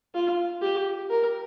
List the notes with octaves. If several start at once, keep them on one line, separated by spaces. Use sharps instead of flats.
F4
G4
A#4